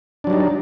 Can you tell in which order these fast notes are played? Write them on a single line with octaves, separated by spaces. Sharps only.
D4 F#3 G3 D#4